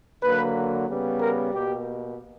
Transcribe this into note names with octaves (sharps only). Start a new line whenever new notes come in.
D3 F#3 A#3 B4
C#3 G3 B3
A#4
B2 A#3 G4